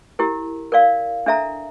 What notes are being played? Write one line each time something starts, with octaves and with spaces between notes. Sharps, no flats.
E4 G4 A#4
A#4 D5 F5
D4 A4 E5 A#5